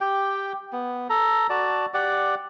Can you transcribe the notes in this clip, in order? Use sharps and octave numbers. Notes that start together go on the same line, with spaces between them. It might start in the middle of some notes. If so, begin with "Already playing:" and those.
G4 G5
B3
A4 A#5
F#4 D5 A5
G4 D5 F#5